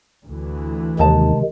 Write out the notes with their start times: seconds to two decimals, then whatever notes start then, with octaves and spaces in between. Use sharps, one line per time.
0.25 D2 E3
0.99 D#2 C3 D#3 G#3 D#4 A5